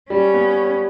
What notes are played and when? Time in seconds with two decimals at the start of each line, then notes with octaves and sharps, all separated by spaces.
0.10 G3 C#4
0.34 B3